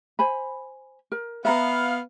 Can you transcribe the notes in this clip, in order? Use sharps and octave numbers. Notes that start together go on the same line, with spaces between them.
C5 G#5 B5
A#4
B3 E5 F5 A#5 B5